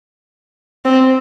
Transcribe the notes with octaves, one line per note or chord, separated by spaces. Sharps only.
C4